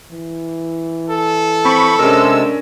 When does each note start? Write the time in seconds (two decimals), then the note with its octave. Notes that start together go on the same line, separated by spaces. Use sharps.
0.12 E3
1.10 A4
1.65 C4 B5 C#6
1.99 C3 G#3 C#4 D4 A#4 E6